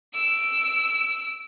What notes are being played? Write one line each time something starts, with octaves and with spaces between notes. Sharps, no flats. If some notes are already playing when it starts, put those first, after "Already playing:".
E6 D7